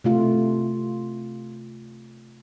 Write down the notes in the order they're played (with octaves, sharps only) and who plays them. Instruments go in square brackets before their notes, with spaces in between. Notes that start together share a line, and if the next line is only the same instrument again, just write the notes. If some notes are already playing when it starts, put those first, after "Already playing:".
[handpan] C3 A3 F4